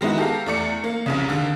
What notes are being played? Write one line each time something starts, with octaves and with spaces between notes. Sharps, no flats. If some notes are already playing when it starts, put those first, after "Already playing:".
D#3 G#3 B3 E4 F#4
G4 A4 F5 A#5
E2 A3 D5 C#7
A#3
F1 C2 C#3
D#2 D3